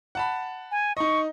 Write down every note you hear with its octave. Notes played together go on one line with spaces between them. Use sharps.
F#5 A5 B5
G#5
D#4 D#5 C#6